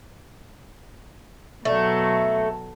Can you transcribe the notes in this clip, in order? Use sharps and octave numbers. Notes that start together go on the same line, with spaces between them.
B2 F#3 A3